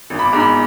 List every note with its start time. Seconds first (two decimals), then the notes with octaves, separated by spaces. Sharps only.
0.10 G#1
0.19 B5
0.25 D6
0.33 G#2
0.40 B5